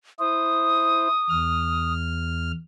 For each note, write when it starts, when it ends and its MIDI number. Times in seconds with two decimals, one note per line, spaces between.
0.19 1.08 64
0.19 1.08 72
0.19 1.93 87
1.30 2.52 40
1.30 2.52 89